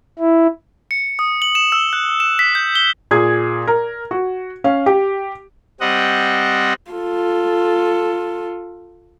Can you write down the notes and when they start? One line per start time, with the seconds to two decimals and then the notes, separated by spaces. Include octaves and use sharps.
0.19 E4
0.91 C#7
1.19 D#6
1.42 F#7
1.55 E7
1.72 E6
1.93 F#6
2.20 E7
2.39 B6
2.55 G6
2.75 G7
3.11 A#2 G#4 G#6
3.67 A#4
4.11 F#4
4.64 C#4 F5
4.86 G4
5.80 G3 C4 D#5 F#5
6.92 F4 A4